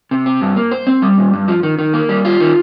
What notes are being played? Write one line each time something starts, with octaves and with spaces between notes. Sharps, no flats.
C3
C4
G2
A#3
C5
C4
G3
A#2
G2
F3
D#3
D#3
A#3
G3
F4
D#3